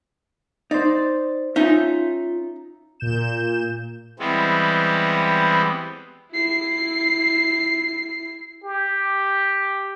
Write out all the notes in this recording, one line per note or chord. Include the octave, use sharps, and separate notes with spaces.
D#4 C5 D5
C#4 D#4 F4 E5
A#2 G6 E7
E3 G3 G#3 B3 C4
E4 C7
G4